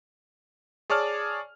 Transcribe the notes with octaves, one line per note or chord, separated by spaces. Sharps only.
G#4 C#5 D5 A5 F6